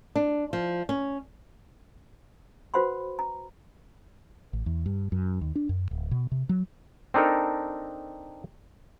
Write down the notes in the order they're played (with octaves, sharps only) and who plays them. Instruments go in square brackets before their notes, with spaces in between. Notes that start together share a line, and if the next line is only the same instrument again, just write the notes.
[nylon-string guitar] D4
F3
C#4
[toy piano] F#4 B4 C5 F#5 B5 C6
A#5
[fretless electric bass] A1
E2
G2
F#2
D#2
D4
F#2
D1
B2
C3
F#3
[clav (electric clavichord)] C4 D4 D#4 A4 A#4